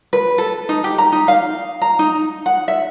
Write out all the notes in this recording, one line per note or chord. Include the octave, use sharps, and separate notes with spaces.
B4
A4
D#4
G4
A#5
D#4
F5
A#5
D#4
F#5
E5